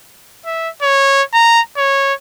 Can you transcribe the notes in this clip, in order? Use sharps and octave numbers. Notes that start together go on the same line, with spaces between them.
E5
C#5
A#5
C#5